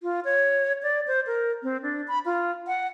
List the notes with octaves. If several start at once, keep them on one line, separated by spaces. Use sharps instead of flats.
F4
C#5
D5
C5
A#4
C4
D4
B5
F4
F#5